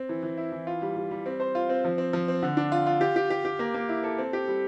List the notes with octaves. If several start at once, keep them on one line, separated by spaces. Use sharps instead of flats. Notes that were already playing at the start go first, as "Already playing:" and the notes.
Already playing: C4
E3
E3
E4
E3
F4
G3
G3
G3
C4
C5
F4
C4
F3
C4
F3
C4
D3
D4
F4
F4
G4
G4
G4
G4
A#3
A#3
E4
A4
C4
G4
G3